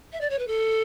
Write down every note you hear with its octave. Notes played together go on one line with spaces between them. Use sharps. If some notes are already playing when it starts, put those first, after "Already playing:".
E5
D5
C#5
B4
A4